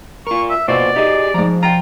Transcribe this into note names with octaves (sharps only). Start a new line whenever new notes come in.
F4 A#4 C#6
E5
B2 A#3 F4 C5 D5
D#4 G4 G#4 D#5
G#2 F3 A#5
F4 G5 A#5